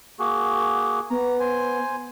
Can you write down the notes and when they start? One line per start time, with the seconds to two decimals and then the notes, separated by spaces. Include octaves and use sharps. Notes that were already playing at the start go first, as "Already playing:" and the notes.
0.19 A#3 F#4 G#4
1.10 B3 A#5
1.40 C5 G#5